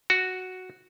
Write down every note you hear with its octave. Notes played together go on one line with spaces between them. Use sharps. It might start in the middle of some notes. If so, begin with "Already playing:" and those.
F#4